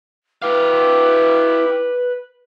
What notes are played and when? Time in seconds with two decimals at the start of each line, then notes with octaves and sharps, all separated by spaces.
0.42 E4 G4 B4 F5